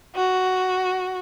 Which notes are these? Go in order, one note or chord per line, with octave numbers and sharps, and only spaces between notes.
F#4